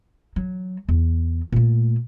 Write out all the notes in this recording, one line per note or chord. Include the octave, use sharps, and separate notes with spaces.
F#3
E2
A#2 A3